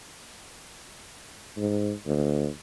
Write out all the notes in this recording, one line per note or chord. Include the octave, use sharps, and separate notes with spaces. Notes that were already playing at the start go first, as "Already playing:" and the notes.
G#2
D2